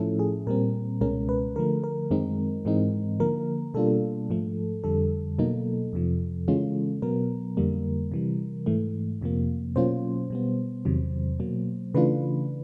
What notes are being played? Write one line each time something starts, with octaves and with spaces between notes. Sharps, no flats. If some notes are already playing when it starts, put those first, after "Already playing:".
Already playing: A2 F3 A3 C#4 E4 A4
G#4
A#2 G3 C4 A#4
C#2 B2 G#3 C#4 A#4
B4
D3 F3 A3 A#4
A#4
F#2 D#3 G#3 C4 D#4
G#2 E3 G#3 C4 D#4
D3 F3 A#3 A#4
B2 G3 A#3 D4 F4 A4
G#2 F3 A3
F2 D3 G3 A4
B2 F#3 A#3 D#4
F2 C3 F3
C#3 E3 G#3 C#4 F4
B2 F#3 B3 A#4
F2 D3 G3 A#3
C3 E3 G3
G#2 E3 A3
F2 C3 F3 A#3
B2 F#3 A#3 C#4 F4 C5
B2 G3 B3
E2 C3 D#3 F#3
B2 F#3 A#3
C#3 E3 A3 D4 F4 B4